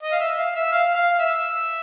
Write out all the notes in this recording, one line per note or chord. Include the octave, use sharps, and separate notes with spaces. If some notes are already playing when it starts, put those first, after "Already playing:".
D#5
F5
E5
F5
E5
F5
F5
E5